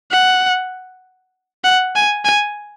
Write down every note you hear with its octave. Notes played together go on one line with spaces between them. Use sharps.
F#5
F#5
G#5
G#5